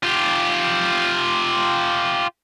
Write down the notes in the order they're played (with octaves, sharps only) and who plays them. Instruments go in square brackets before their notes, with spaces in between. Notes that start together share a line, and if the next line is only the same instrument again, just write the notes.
[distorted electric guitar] F4 G4